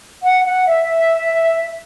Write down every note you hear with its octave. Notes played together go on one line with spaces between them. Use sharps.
F#5
F#5
E5